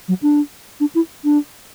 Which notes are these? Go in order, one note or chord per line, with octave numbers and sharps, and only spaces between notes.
F#3
D4
D4
E4
D4